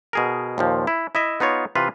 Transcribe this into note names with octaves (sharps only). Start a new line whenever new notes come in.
B2 G#4 A#4
D#2 A#2 F3
E4
E4 D#5 E5
B3 D#4 F4 C#5
C3 E3 F4 B4